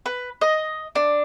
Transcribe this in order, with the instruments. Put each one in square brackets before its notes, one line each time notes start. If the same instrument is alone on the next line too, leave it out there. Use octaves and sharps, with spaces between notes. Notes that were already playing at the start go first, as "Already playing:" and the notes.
[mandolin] B4
D#5
D4